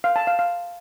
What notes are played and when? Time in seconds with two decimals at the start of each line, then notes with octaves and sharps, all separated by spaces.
0.04 F5
0.16 A5
0.27 F5
0.39 F5